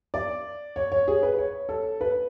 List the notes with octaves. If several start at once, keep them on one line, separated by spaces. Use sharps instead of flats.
D5
C#5
C#5
G#4
B4
C#5
A4
B4